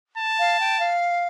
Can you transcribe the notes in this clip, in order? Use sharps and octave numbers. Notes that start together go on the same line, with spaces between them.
A5
F5
G5
F5